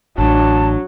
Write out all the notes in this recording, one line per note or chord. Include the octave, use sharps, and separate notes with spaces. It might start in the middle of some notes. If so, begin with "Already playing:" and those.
A1 F#3 D4 A5